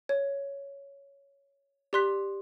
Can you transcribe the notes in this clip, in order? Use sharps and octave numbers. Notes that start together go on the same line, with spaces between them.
C#5
G4 D5 C6 F#6 B6